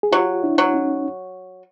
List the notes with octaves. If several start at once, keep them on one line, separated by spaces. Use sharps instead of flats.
G#4
F#3 F4 G4
D4 E4
F#3
C#4 D#4